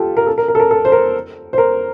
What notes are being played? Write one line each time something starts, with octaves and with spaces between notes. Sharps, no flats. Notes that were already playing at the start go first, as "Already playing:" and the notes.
Already playing: F4 G4 A4
A#4
A4
A#4
A#4
A4
A#4
A4
C5
A#4
C5
A#4